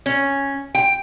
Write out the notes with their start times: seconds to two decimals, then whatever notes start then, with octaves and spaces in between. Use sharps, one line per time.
0.06 C#4
0.75 G5